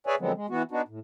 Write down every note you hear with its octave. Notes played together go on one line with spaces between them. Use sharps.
G#4 B4 C#5 D5 E5 G#5
D3 F3 F#3 G#3 B3 C4
G#3
E3 B3 F#4
B3 D4 D#4 F#4
A2